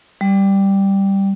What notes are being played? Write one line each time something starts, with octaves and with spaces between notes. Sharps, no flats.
G3